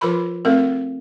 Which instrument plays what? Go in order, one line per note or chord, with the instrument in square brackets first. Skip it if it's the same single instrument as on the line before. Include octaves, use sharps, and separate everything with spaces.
[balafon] F3 F4 A#4 B4 B5 C6
A3 C4 A4 A#4